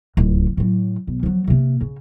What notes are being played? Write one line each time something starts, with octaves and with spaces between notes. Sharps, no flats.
D1 C#2
A2 F#3
B1
F3 F#3
C3 A#3
C#3